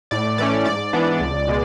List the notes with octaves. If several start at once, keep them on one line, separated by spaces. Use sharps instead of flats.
A2 D5
E3 A3 C#4 D5
G#2 D5
E3 B3 D4
C#2
B2 G#3